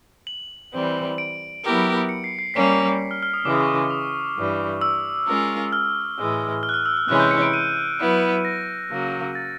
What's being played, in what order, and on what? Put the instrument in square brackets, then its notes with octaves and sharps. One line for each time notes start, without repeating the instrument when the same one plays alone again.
[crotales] F#7
[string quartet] E3 G3 C4
[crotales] D7
[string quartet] F#3 B3 E4 G4 A#4
[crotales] C#7
C7
C7
[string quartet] G3 A#3 C#4 [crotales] B6
[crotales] F6
F6
D#6
[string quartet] C#3 E3 G#3 [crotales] D6
[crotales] C#6
D6
D#6
[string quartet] G2 E3 G3
[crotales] E6
[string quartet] G#3 C#4 F4 A#4
[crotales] F6
[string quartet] A2 E3 G#3
[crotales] F6
F#6
F6
E6
F6
[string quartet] C3 E3 G#3 C#4 E4 [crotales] F#6
[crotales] G6
C#7
D7
D#7
[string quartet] F#3 B3 E4
[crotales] A#6
[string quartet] C#3 F#3 A#3
[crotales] A6